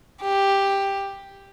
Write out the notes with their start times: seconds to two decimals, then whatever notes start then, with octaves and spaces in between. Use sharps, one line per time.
0.22 G4